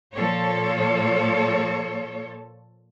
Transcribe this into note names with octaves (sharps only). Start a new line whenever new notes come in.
A#2 F3 A4 C#5